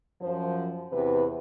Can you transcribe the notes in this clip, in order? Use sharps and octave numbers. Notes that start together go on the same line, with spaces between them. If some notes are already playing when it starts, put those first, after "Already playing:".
F#2 F3 C5
E2 C3 B4